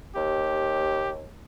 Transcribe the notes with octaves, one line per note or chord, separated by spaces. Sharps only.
D#2 G4